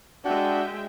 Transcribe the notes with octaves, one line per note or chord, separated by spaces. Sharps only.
G#3 D4 F#4 E5 G5